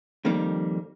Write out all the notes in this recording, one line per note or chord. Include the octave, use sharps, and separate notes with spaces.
F2 D#3 G3 A#3